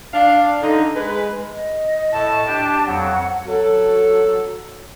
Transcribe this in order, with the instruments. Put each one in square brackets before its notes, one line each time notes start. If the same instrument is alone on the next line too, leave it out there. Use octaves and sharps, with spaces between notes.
[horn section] D4 F5
D3 D#4
G#3 B4
[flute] D#5
[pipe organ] A2 [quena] A5
[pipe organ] D4 G4 G5
[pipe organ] F2 F#3 [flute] F#5
[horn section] F#3 F#4 A4